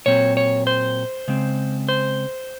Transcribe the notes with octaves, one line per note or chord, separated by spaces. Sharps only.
A#2 F#3 C4 C#5
C#5
C5
C#3 G#3 C4
C5